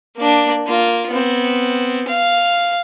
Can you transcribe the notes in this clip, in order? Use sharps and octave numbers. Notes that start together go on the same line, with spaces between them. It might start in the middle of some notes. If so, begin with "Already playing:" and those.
A#3 D4
A#3 F4
B3 C4
F5